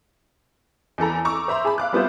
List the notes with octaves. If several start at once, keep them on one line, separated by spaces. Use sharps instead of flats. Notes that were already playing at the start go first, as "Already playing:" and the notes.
E2 E3 A4 A#5
A#5 C#6 D6 E6
C5 E5 A#5 C6
G#4 A5 B5
F5 D6 F#6
G3 B3 F4 C5 E5